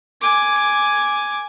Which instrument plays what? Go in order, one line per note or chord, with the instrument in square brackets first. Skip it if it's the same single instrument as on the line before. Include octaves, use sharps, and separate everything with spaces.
[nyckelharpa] G#5 D6